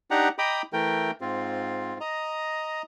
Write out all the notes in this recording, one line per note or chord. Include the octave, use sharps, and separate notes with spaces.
D4 D#4 G4 F#5 A#5
D#5 G5 A#5 B5 D6 D#6
E3 A3 A#4 G5
G#2 C4 F4
D#5 A#5